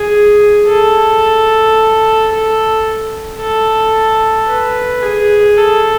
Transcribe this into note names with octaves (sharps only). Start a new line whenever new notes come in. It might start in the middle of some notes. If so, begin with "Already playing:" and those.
Already playing: G#4
A4
A4
A4
B4
G#4
A4